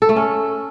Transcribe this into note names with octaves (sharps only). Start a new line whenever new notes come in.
A4
A3
C#4